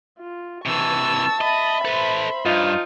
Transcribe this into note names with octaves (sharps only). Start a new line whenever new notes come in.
F4
C3 E3 A5 C#6 E6
D#5 E5 B5
A4 B4 C5
G2 F3 D#4 F4